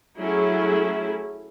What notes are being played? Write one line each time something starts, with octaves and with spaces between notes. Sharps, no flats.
F#3 A3 C#4 E4 G#4